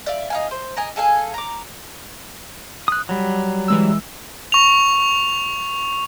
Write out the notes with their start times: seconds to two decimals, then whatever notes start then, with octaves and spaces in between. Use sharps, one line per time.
0.06 D5 E5 F5
0.30 D#4 F5 G#5
0.51 C5
0.76 A#4 D#5 G#5
0.96 G#4 A4 F5 G#5
1.34 A#5 D6
2.88 D#6 F#6
3.09 F#3 G3
3.68 E3 G#3 E6
4.52 C#6 F7